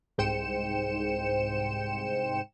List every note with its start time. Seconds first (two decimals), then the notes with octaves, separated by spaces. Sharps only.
0.18 C2 G#2 C5 G5 C#7 E7